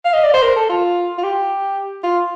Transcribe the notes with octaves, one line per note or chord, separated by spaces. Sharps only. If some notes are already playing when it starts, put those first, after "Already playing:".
F5
D#5
D5
C5
A#4
A4
F4
F4
G4
F4